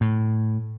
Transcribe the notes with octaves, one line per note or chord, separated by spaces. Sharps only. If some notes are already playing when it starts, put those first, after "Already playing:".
A2